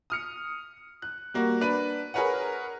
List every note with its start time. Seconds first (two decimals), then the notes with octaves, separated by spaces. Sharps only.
0.10 D#6 F6 C#7
1.02 F#6
1.34 G3 A#3 F#4
1.61 D4 B4 D#7
2.14 G#4 A#4 B4 C#5 F#5